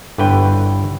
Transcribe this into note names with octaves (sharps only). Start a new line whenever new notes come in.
G1 D3 E4 B4 C#5 G5